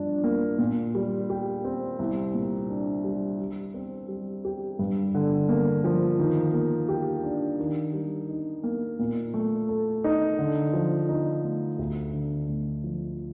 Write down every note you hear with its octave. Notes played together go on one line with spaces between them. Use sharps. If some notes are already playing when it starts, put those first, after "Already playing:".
Already playing: G2 F3 D4
A#3
A#2
G3
G4
C4
C2
A#2
D4
G3
G3
C4
G3
G4
G2
D3
A#3
F3
D#3
A#3
G4
D4
D#3
G3
D#4
A#3
A#2
A3
A4
D#4
D3
F3
D#4
A3
D2
D3
D2
F3